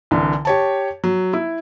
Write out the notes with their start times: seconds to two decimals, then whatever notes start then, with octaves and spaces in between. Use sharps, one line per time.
0.11 C2 D3 E3
0.45 G4 C#5 A5
1.04 F#3
1.33 E4